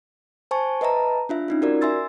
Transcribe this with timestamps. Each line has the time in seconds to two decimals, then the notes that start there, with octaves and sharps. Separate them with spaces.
0.51 C5 G#5 A5 C#6
0.81 B4 D#5 E5 A5 A#5
1.29 D4 F4 E5
1.48 C#4 D#4 F4
1.62 F#4 A#4 D5
1.81 E5 G#5 C6 E6 A6